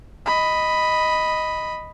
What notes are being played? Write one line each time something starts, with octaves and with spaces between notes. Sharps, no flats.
D#5 B5